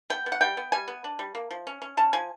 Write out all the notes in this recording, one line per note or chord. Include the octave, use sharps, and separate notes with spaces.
B3 G5
B3
F#5
G3 G5
B3
G3 G#5
B3
D4
G3
A#3
F3
C#4
C#4
C#4 A5
F3 G#5